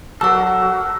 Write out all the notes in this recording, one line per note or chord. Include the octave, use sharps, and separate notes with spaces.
F#3 D4 F#4 A4 A#4 F#5 E6
F#4